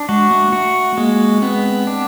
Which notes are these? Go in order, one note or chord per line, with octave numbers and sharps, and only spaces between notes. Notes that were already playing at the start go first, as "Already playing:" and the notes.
Already playing: D4
G#3 F#4
A3
A3 F#4
G#3 A#3
B3 C4
D4